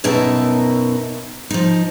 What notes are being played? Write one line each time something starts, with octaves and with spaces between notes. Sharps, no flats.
F#2 B2 D#4 A#4 E5 A5
F3 D#4